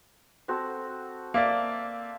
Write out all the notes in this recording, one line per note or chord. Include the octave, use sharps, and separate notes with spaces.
C4 F#4 A4
A#3 D5 E5 F5